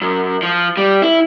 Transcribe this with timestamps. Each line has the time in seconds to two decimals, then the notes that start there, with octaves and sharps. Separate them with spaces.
0.01 F#2
0.43 F3
0.77 G3
1.02 E4